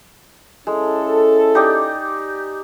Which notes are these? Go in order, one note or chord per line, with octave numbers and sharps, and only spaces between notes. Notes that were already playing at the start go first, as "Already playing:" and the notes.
G#3 C#4 E4 A4
D#4 G4 D5